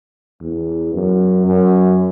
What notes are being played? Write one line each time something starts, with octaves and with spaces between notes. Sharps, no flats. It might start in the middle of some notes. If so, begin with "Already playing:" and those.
E2
F#2
F#2